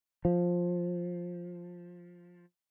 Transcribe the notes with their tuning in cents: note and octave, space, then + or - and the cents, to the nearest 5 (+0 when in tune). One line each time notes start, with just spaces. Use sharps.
F3 +10